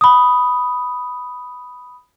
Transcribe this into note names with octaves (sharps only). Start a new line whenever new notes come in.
B5 D#6